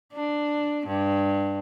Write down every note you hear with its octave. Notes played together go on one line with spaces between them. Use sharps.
D4
G2